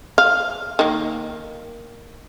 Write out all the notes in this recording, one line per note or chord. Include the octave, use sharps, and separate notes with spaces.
F5
D#3 A#3